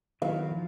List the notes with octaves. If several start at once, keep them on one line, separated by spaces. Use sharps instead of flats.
D#3 F#3 B3 E4 F5
F3